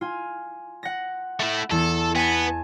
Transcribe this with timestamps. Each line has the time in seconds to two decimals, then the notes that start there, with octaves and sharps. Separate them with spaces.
0.01 F4 G#5
0.83 F#5 A#6
1.40 A3 E4
1.71 E2 A4
2.16 B3 G#5 A5